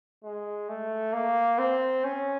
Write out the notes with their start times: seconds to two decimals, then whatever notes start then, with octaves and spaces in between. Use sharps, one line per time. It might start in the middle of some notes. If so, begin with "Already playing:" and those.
0.24 G#3
0.69 A3
1.13 A#3
1.58 C4
2.04 C#4